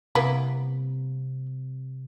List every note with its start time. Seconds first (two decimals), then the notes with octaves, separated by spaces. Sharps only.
0.15 C3 A#3 B3 E4